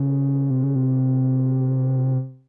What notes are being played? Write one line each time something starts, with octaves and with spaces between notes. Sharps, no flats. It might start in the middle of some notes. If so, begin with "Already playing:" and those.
Already playing: C#3
C3
C#3
C3